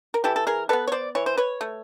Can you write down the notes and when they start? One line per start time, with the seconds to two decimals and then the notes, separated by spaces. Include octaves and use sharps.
0.14 A#4
0.24 E3 G4 A4
0.36 A4
0.47 G#4 A#4
0.69 G#3 A4 B4
0.73 B3
0.87 C#5
0.92 C5 D5
1.15 E3 C#5
1.26 C5
1.37 B4 C#5
1.61 A3